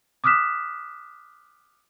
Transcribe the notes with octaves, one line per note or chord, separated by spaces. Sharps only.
D6 D#6 F6 F#6 B6 E7